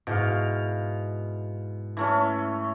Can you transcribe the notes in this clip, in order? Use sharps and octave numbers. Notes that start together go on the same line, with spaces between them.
G#2 B2 E4 F5 G6
E3 A3 C#4